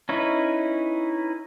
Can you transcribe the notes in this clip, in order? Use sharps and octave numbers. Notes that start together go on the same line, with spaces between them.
C#4 D#4 E4 B4